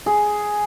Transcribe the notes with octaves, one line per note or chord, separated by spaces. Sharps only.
G#4